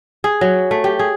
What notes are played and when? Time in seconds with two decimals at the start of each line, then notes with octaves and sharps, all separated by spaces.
0.24 G#4
0.41 F#3
0.71 A3
0.84 G4
0.99 G#4